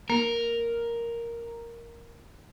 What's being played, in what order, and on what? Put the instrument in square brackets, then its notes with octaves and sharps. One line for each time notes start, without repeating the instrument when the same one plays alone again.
[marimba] A#3 [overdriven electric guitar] A#4